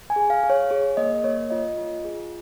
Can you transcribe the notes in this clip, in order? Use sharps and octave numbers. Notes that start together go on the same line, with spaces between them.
G#5
G#4
F5
G#4
C#5
G#4 C#5
A#3 D#5
A#3 C#5
F4 D#5
F4
G#4